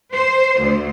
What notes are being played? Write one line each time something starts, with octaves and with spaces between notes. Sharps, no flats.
C5
D2